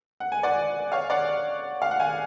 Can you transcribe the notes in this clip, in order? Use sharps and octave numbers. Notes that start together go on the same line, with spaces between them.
F#5
G#5
D5 F#5
C#5 F5
D5 F#5
F5
F#5
F5 G#5